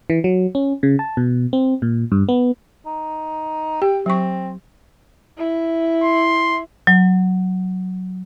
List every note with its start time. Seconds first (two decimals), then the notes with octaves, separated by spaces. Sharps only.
0.10 E3
0.24 F#3
0.55 C#4
0.83 C#3
0.99 A5
1.17 B2
1.53 C4
1.82 A#2
2.12 G2
2.29 B3
2.86 D#4
3.82 G4 G5
4.06 F#3 C4 C#6
5.38 E4
6.04 C6
6.87 F#3